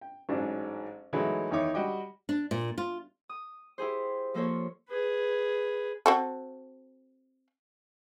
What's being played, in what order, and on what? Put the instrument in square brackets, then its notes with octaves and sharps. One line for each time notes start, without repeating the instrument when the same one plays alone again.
[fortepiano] G5
A1 G#2 F#3 D4
E3 F#3 G#3 A3 B3 D#4
E2 D#3 D#4 E4 C#5 D6
G3 F#4 D#5 G5 D6
[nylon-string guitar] D4
A#2
F4
[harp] D#6
E4 G4 G#4 C5
F3 A#3 A4 C5 C#5
[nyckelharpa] G#4 B4
[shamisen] C4 F#4 A4